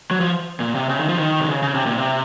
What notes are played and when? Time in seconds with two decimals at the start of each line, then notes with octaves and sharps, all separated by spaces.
0.11 F#3
0.20 F3
0.60 A#2
0.75 C3
0.89 C#3
0.99 D#3
1.09 F3
1.19 D#3
1.40 C3
1.48 C#3
1.63 C#3
1.74 C3
1.86 A#2
1.97 C3